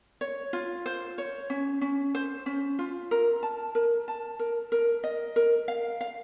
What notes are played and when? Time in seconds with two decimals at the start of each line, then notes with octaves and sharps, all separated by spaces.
0.21 C#5
0.53 F4
0.86 C5
1.18 C#5
1.50 C#4
1.81 C#4
2.15 C5
2.46 C#4
2.79 F4
3.11 A#4
3.43 A5
3.75 A#4
4.08 A5
4.39 A#4
4.72 A#4
5.04 D#5
5.36 A#4
5.68 F5
6.01 F5